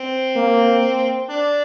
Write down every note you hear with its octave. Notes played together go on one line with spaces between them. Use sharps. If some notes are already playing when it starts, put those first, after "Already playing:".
Already playing: C4
A#3
D4